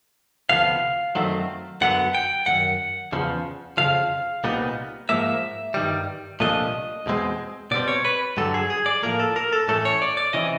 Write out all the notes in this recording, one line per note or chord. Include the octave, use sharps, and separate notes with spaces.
D2 C3 F3 B3 F5
F#2 D#3 F#3 A3 C4
F#2 D3 F#3 B3 F#5
G5
F#2 D#3 F#5
E2 C#3 F3
F2 C#3 F3 F5
C2 A#2 G3 B3 D#4
G#2 F3 A#3 E5
G2 D#3 G3
C2 A#2 F3 A3 D4 D#5
E2 B2 G#3 C4
B2 G3 C4 D5
C#5
B4
G2 D3 F#3 A4
G#4
G#4
D5
A2 F3 A#3 A#4
A4
A#4
A4
A2 E3 A3 C#4 A4
C#5
D5
D5
C3 E3 C#4 D#5